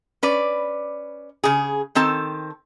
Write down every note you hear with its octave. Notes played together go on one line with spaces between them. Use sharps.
C#4 B4 D5
C#3 G#4
D#3 C4 A4 A5